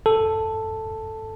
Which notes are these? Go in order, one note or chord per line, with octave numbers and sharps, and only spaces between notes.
A4